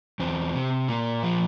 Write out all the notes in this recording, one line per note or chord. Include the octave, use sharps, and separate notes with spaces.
E2 C4
C3
A#2 A#3
F3